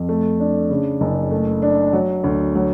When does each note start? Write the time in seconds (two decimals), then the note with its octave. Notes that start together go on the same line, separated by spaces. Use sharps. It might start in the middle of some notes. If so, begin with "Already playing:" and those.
Already playing: F2
0.09 A3
0.40 D4
0.70 C#3
1.01 F#1
1.31 A3
1.62 D4
1.93 F#3
2.24 D2
2.55 F#3